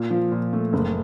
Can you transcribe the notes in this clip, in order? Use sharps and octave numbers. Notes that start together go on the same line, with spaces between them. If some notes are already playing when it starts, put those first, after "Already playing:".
Already playing: A#2
F3
A#2
A3
F#1